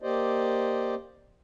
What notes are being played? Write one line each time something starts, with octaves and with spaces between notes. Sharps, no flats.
A#3 G4 C5 D5 D#5